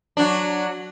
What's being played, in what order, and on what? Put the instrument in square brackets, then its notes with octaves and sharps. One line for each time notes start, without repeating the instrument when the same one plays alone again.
[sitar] F#3 D4